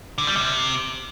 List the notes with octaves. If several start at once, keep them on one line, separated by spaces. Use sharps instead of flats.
D3
G3
C3